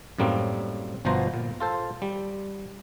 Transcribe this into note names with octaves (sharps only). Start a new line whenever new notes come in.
F#2 A2 G3 A#3 C4
G1 B2 F3 B3 C5 A#5
A#2
F4 A4 C5
G3